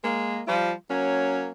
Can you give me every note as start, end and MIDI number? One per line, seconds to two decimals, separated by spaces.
0.04 0.41 56
0.04 0.41 58
0.47 0.73 53
0.47 0.73 55
0.47 0.73 65
0.90 1.52 54
0.90 1.52 58
0.90 1.52 61